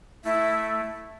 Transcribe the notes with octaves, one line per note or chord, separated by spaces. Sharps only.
A3 E4